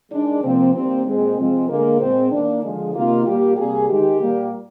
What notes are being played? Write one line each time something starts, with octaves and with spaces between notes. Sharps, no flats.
D#3 G#3 D4
C3 F3 A#3 C4
D#3 G3 A#3 C4
A#2 G#3 C4
C3 F3 G#3 C4
D3 G#3 A#3
A#2 G#3 C4
D#3 A#3 D4
D3 F3 G#3
C3 D#3 A#3 F4
A#2 G3 A#3 G4
C3 G3 A#3 G#4
D#3 G#3 G4
A#2 G3 A#3